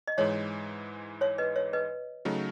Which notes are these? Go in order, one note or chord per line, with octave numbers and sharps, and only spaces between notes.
D#5
G#2 E3 G#3 C#5 E5
C#5 E5
B4 D#5
C#5 E5
B4 D#5
C#3 F#3 A3 D#4